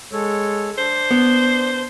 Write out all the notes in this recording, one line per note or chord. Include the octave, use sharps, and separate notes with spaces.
G#3 A4 C#5
D4 C5
B3